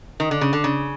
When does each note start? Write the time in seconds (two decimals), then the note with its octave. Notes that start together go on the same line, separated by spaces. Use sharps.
0.20 D#3
0.31 D3
0.41 C#3
0.53 D3
0.64 C#3